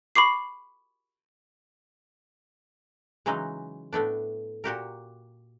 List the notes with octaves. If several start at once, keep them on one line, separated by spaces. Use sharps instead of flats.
B5 C#6 D6 C7
C#3 E3 F#3 G#3 D#4
A2 A3 B3 D4
A#2 F#4 G4 A#4